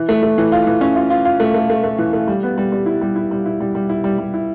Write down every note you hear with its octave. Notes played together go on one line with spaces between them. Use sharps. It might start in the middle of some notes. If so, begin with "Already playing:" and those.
Already playing: E3
A3
A3
E3
F4
E3
C#4
F4
F4
F4
A3
A3
A3
A3
E3
A3
G3
B3
G3
G3
E4
G3
E4
G3
E4
G3
G3
E4
G3
G3
E4